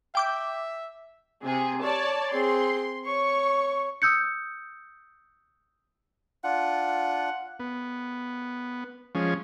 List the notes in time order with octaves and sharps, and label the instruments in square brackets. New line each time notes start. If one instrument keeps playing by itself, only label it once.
[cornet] E5 [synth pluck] G5 D6 G6
[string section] C3 G#4
C#5 D5 A5
[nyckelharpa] C4 G#4 [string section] C6
[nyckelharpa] C#5 [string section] C#6
[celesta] D#6 E6 G6 C#7
[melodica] D4 F4 [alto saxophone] F#5
[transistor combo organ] B3
F3 G#3 C#4